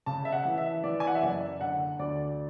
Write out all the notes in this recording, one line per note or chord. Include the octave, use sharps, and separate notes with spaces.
C#3 A5
E5
F#5
E3
E5
E3 D5
G#5
F#5
E5
F#1 D5
D3 F#5
D2 D5